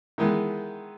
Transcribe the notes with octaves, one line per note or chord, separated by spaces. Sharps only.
D#3 E3 G#3 B3